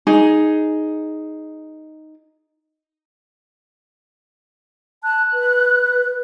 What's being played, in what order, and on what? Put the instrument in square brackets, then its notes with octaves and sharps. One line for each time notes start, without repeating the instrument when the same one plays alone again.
[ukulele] D#4 G#4
[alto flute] A5 [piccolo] F#6
[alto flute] B4